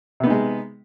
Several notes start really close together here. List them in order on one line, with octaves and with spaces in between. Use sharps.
C3 B3 D#4 G#3